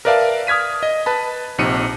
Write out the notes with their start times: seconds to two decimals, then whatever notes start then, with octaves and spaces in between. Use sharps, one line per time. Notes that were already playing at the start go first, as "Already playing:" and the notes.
0.05 A#4 B4 D5 E5 F5 A5
0.47 D#6 F6 G#6 B6 D#7
0.83 D#5
1.06 B4 A5 B5
1.58 A#1 C3 D#4 C#7 D#7